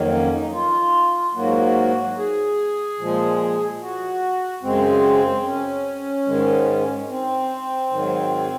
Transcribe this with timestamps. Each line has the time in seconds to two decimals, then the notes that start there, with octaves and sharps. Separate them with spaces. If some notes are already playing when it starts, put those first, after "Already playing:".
Already playing: F2 D#3 F#3 A#3
0.12 C#4
0.33 D#4
0.53 F4
1.35 G#2 F#3 A#3 F#4
2.17 G#4
2.99 A#2 F3 G#3
3.81 F#4
4.63 F#2 C#3 G#3 C4
5.45 C#4
6.26 G#2 D#3 G#3
7.09 C4
7.91 G#2 D#3 F#3